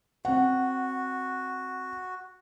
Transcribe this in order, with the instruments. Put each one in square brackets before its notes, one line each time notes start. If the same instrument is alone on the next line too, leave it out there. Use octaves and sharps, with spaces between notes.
[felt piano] C4 F#5 [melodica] F#4